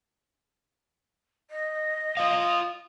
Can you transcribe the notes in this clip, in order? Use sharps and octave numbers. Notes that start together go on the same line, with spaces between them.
D#5
F4 C#5 F5 D#6